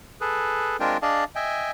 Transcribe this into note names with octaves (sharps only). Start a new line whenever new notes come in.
G#4 A4 B4
G#3 C4 D4 F4 A#4 G5
D4 G#4 D5 D#5 F5 A5
D#5 E5 G5 G#5